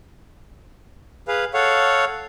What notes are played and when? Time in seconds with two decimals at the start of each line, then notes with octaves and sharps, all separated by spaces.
1.28 G#4 B4 F5
1.54 A4 C#5 F5 F#5